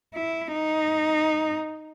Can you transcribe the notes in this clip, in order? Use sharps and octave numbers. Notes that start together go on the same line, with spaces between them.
E4
D#4